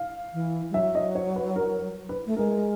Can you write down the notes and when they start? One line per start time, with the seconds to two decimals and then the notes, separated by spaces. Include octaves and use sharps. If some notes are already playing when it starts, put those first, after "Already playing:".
Already playing: F5
0.33 E3
0.70 G3
0.74 F#3 E5
0.95 D#5
1.15 C#5
1.36 B4
1.56 A#4
2.09 B4
2.26 A3
2.36 G#3 A#4